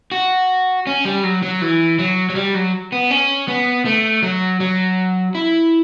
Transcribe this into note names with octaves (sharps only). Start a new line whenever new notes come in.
F#4
C#4
G3
F#3
F#3
E3
F#3
F#3
G3
F#3
B3
C#4
B3
A3
F#3
F#3
E4